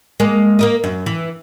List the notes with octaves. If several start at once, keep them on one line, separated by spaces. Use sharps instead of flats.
G#3 A#3
A#3 A#4 D#5
F#2
E3